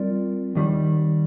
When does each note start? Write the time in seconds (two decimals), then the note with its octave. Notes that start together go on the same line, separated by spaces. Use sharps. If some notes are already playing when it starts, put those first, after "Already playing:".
Already playing: G3 C4 F4 A#4 D5
0.55 D#2 D#3 G3